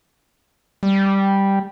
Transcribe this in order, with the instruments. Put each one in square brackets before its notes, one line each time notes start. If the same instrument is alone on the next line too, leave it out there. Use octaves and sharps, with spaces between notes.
[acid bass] G3